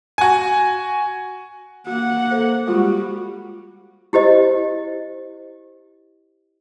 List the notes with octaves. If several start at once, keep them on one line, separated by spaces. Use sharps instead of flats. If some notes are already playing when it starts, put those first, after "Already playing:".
F#4 G#5
A#3 F#4 F#5
A4 C5
G3 G#3 F4 F#4
E4 G4 C5 D#5